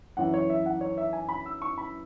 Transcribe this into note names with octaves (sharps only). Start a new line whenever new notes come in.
F#2 E3 F#5
C#5
E5
F#5
C#5
E5
G#5
B5
E6
C#6
B5